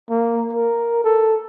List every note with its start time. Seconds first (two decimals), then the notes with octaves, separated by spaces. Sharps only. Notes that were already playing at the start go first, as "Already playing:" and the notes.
0.10 A#3
0.53 A#4
1.04 A4